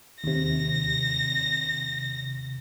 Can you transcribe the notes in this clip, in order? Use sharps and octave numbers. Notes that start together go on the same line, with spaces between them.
D#2 C3 A#6